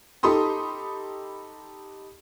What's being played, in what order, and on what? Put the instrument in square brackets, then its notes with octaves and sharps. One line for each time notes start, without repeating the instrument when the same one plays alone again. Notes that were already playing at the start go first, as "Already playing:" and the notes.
[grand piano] D#4 G4 A4 B5 C6 D#6